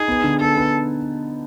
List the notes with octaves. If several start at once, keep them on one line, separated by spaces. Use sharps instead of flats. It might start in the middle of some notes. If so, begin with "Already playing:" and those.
Already playing: D#4 G#4
B3
D3
B3 A4
B3